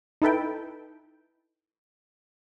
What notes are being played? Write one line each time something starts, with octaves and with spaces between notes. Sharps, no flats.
D#4 E4 A4 B4 G5